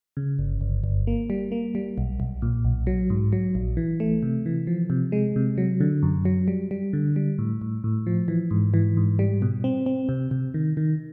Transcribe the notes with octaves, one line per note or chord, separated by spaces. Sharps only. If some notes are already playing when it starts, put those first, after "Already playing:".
C#3
G1
G1
G1
A#3
G3
A#3
G3
B1
B1
A#2
B1
F#3
G#2
F#3
A#1
E3
A3
C3
E3
F3
C3
G#3
C3
F#3
D3
F#2
F#3
G3
G3
D3
G3
A2
A2
A2
F3
E3
G#2
E3
G#2
G3
B2
C4
C4
C3
C3
D#3
D#3